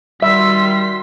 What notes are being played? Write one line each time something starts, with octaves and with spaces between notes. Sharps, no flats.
D#3 G3 F#4 E5 C6 B6